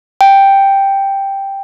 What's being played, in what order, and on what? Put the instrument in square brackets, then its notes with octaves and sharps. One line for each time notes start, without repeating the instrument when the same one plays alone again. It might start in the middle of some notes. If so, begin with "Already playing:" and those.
[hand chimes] G5